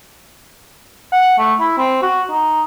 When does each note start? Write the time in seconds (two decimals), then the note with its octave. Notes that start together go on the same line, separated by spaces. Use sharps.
1.12 F#5
1.38 A3
1.60 E4
1.78 C4
2.02 F#4
2.31 D#4